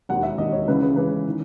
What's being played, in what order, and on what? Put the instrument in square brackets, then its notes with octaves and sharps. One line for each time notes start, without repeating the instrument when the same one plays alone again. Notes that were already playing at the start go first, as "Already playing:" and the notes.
[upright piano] E1 D#2 D#3 F#5
E5
E1 D#2 D#3 D#5
C#5
C#2 C#3 E3 B4
B4
C#2 C#3 E3 B4
D#3